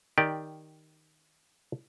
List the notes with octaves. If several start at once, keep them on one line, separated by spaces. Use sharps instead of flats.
D#3 G4 D5 G5